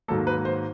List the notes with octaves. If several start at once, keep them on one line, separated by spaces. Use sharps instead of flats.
G#2 D#3 F#3 A#3 A4
B4
C5